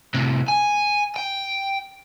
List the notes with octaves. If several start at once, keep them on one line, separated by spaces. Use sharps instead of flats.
A2 C3
G#5
G5